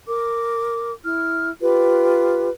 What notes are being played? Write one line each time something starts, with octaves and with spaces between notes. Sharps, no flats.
A#4 D6
E4 F6
F4 G4 B4